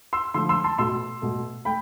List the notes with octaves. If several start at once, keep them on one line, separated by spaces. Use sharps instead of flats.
C6 E6
D3 F3 A3 C6 E6
C6 E6
A5 C6
B2 A3 C6 E6
B2 A3
A3 G5 B5